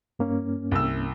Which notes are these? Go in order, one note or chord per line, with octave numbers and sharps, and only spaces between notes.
G2 A#3 C#4
C2 E6